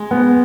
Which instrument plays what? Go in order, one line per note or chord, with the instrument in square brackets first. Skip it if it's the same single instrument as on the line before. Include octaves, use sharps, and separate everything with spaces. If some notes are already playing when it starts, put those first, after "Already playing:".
Already playing: [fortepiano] G#3
[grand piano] B3